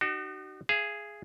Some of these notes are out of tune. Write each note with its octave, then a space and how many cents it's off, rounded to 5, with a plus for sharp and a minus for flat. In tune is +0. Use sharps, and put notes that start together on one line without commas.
D#4 -40 F#4 +35
G#4 +0 F5 -45